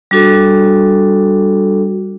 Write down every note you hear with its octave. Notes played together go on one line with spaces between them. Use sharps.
G3 D4 F#4 A4